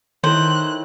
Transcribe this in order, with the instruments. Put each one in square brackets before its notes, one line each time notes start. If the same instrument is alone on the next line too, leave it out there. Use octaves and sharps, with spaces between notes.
[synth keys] D#3 [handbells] E4 A4 C#5 [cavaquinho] C5 [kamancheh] F#6